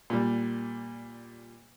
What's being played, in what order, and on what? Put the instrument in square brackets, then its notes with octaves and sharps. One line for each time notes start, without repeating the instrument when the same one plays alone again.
[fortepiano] A#2 G3